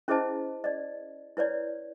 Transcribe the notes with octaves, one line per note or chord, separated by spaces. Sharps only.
C#4 E4 G#4 C5 D#5 A5
D5 D#5
E4 B4 C#5 D5